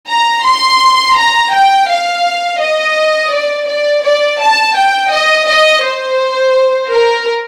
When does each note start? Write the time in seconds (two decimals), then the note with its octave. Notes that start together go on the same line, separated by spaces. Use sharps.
0.08 A#5
0.45 C6
1.17 A#5
1.52 G5
1.88 F5
2.60 D#5
3.32 D5
3.68 D5
4.03 D5
4.40 A5
4.76 G5
5.11 D#5
5.47 D#5
5.84 C5
6.92 A#4